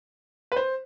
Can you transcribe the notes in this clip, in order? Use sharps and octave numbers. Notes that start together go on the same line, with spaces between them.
B4
C5